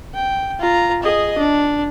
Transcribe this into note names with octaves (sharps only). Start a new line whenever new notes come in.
G5
F4 A#5
G#4 D#5
D4